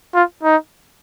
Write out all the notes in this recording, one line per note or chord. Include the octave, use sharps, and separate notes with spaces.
F4
D#4